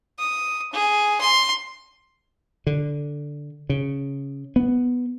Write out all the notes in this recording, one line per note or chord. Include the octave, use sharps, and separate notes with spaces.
D#6
G#4
C6
D3
C#3
B3